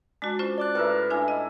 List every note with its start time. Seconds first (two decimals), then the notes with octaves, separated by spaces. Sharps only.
0.22 G#3 D4 F#4
0.39 C#4 F4 C5
0.58 D5 D6 F#6
0.75 A2 A#4 B4 E5
1.10 D4 E4 G#5
1.28 D#5